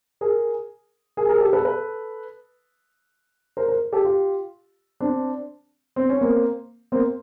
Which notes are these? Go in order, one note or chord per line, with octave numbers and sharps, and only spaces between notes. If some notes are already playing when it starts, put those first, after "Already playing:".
G#4 A#4
G#4 A#4
G#4 A#4
G4 A4
A4 B4
A4 B4
A#4 C5
A#4 C5
G4 A4
F4 G4
C4 D4
C4
C#4
A#3 C4
A#3 C4